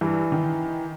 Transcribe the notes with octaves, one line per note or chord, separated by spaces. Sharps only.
G2 E3
D#3